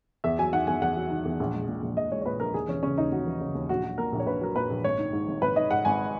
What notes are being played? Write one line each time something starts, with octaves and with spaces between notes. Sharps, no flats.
E2 E5
F#3 G#5
D#3 F#5
E2 G#5
E2 F#5
F#3
D#3
E2
A#1
G#3
A#2
A#1
A#1 D#5
G#3 C#5
C#5
A#2 B4
A#1 A#4
D#2 G#4
E3 C#4
C#3 C#4
D#2 D#4
D#2 F#4
E3
C#3
D#2
A#1 F#4
F#3
A#2 A#4
A#1
C#5
A#1 B4
F#3 A#4
A#2 B4
A#1
G#1 C#5
D#3
G#2
G#1
G#1 B4
D#3 D#5
G#2 F#5
G#1 G#5